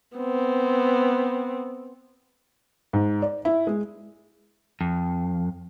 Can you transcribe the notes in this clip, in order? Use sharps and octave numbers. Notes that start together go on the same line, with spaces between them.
B3 C4
G#2
D5
E4
G#3
F2